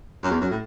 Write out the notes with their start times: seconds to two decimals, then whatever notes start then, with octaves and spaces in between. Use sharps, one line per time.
0.23 F#2
0.30 E2
0.40 F#2
0.50 A2